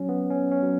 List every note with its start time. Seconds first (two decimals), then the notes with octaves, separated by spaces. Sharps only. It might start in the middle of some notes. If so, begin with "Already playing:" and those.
Already playing: F#3 C#4
0.09 B3
0.30 C#4
0.51 C#4
0.62 F#3